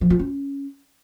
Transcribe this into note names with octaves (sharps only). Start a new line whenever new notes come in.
F3
F4
C#4